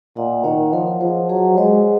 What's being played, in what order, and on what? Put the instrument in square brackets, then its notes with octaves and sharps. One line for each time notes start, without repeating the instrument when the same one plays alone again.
[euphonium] A#2 [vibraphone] D#5 F#5
[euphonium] D#3 [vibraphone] C#5 F5
[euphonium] F3 [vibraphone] A#4 C#5
[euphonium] F3 [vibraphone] G#4 C5
[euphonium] F#3 [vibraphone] G#4 C5
[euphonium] G#3 [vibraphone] C5 D#5